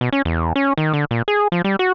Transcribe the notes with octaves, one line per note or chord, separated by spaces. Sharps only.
B2
C#4
E2
C#4
D#3
D3
A#2
G#4
F3
G3
F#4